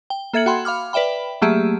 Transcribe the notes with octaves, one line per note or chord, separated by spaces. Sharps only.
G5
A#3 A4 E5 G#6 C#7 F#7
F#4 F#5 G5 B5 C6
F5 B5 D6 F6
B4 D5 E5 G5 B5
F#3 A3 A#3 G4 G#4 E5